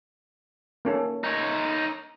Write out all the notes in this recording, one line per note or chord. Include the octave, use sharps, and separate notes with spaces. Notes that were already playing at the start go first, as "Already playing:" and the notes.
A#3 C#4 A4
D#4 C#5